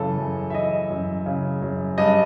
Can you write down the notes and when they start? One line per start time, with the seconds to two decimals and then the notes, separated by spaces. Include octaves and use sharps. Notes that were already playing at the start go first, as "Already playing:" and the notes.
Already playing: F#2 C#3 E3 A4
0.18 F#2
0.50 E5
0.54 E3 D#5
0.90 F#2
1.26 C#3
1.62 F#2
1.98 G2 D#5